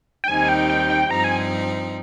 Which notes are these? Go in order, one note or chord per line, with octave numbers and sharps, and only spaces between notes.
G5
D#2 D#3 G3 C4 D#4 G#5
G5
G5
G5
G2 F3 C4 D#4 A#5
G#5